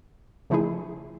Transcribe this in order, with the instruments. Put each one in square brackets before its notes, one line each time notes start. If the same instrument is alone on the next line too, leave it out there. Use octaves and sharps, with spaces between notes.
[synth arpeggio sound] C#3 F3 A3 D#4 E4 G#4